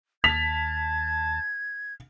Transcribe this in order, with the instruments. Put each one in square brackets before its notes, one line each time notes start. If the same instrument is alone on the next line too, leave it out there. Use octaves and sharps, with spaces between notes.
[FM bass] D#2 [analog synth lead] A5 [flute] G#6 [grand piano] B6 F7